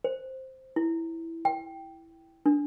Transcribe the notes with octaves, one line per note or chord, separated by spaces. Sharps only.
C5
E4
G5
D4